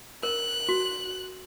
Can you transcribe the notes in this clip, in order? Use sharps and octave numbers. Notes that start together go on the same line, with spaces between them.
A#4 F#6
F#4